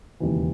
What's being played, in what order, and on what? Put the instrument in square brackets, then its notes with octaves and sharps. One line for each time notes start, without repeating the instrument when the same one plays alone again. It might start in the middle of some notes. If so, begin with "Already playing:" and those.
[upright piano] E1 D#2 C#3 E3